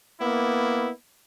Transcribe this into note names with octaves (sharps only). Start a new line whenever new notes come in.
A#3 B3 E4